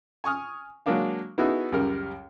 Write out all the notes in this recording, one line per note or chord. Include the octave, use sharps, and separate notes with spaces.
G#5 C#6 D#6 F6
F#3 G#3 A#3 D4 F5
B3 D#4 E4 F#4 G#4 A4
C#2 F#2 G3 A#4